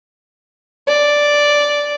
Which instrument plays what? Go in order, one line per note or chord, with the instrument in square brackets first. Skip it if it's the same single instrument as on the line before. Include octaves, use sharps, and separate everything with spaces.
[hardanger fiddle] D5